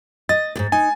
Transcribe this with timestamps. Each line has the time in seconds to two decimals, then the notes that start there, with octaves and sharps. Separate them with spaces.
0.29 D#5 A6
0.56 D#2 G#2
0.72 D#4 G#5